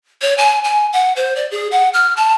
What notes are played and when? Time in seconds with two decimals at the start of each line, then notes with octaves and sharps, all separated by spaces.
0.22 C#5
0.38 G#5
0.64 G#5
0.93 F#5
1.16 C5
1.36 D5
1.51 G#4
1.71 F#5
1.94 F6
2.17 A5